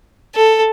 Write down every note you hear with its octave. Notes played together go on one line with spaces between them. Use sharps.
A4